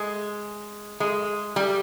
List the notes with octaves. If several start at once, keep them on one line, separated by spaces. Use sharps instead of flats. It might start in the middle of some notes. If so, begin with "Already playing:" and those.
Already playing: G#3
G#3
G3